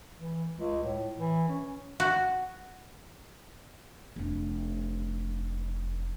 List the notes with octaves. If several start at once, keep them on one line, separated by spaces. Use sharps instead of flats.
E3
C#2
A2
E3
C#4
F#4
F1 D4